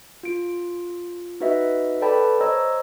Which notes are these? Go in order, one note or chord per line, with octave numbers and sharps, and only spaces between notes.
F4 D7
D#4 F#4 B4 D#5 E5
A4 B4 D5 G5 A5 B5
C5 C#5 D#5 A#5 E6